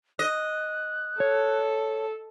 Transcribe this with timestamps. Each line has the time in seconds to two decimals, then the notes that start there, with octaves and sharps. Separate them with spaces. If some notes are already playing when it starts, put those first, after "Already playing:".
0.19 D#5 F#6
1.20 A4 C#5